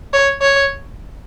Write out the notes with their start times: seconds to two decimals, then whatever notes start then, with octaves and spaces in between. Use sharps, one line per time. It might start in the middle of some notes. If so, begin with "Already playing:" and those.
0.13 C#5
0.42 C#5